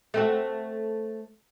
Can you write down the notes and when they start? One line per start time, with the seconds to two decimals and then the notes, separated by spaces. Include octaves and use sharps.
0.14 A3 C4 F#4